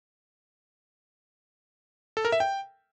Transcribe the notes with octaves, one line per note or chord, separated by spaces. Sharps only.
A4
A#4
E5
G5